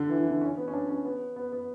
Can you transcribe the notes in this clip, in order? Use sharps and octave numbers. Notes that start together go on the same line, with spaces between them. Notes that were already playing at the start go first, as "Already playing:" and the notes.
Already playing: D3
E3
E3
D3
C#4
B3
C#4
D4
C#4
B3
B3
B3